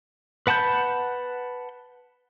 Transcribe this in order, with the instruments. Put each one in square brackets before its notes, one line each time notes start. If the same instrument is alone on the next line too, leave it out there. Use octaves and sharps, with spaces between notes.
[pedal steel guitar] B4 F#5 A5 B5 G6